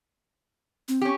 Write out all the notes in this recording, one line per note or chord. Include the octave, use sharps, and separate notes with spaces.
C4
C#4 G4